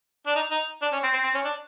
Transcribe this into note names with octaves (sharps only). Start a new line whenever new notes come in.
D4
D#4
D#4
D4
C#4
C4
C4
C4
C#4
D4